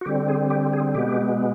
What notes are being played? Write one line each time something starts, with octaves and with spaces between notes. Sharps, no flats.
F#4
D3 G3 C4 G4
G#4
G4
G#4
B2 G#3 B3 G4